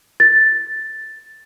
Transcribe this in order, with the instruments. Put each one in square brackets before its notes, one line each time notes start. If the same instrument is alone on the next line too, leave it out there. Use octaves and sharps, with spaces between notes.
[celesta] A6